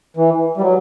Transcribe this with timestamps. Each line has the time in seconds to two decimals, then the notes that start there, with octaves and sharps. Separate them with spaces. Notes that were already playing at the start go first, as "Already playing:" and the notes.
0.17 E3
0.57 G3
0.61 F#3